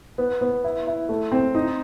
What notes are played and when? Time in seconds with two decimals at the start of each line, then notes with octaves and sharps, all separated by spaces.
0.18 B3
0.41 B3
0.64 E4
0.87 E4
1.09 A3
1.32 C4
1.55 D#4